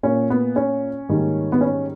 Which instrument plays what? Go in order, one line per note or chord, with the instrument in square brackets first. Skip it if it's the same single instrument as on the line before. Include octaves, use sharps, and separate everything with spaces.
[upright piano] A#2 A#3 C#4
B3
C#4
G#2 D#3 G3 A#3
B3
C#4